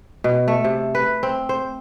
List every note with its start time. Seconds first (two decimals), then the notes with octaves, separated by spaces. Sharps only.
0.24 B2
0.48 A3
0.64 C3
0.95 B4
1.23 C4
1.49 C5